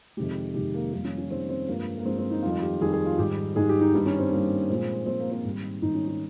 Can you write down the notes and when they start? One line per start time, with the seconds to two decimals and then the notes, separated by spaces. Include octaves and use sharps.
0.17 F2 C3 D#3 G#3 G4
0.54 F2 C3 D#3 G#3 G4
0.74 A#3
0.92 F2 D#3 G3 A#3
1.05 C#4
1.18 C#4
1.30 F2 D#3 G3 C4
1.49 C4
1.68 G2 F3 G#3 A#3
1.98 A#3
2.05 G2 F3 G#3 C4
2.19 C4
2.31 D#4
2.43 F2 D#3 G3 F4
2.62 G4
2.81 F2 D#3 G3 G#4
2.93 G#4
3.06 F4
3.19 G#2 D#3 G3 G4
3.56 G#2 D#3 G3 G#4
3.69 G4
3.81 D#4
3.94 G2 D#3 G3 D#4
4.06 C#4
4.19 C4
4.31 G2 D#3 G3 A#3
4.70 A#2 F3 G#3 C4
5.06 A#2 F3 G#3 C4
5.20 A#3
5.32 C4
5.45 G#2 D#3 G3
5.82 G#2 D#3 G3 D#4
5.95 C#4
6.08 D#4